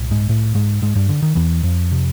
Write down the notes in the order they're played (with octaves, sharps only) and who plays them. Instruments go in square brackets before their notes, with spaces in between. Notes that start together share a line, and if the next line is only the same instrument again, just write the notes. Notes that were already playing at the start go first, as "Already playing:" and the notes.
Already playing: [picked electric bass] C2 A#2
G#2 G#3
A2 A3
G#2 G#3
G#2 G#3
G2 G3
D3
D#3
E2 E3
F2 F3
C3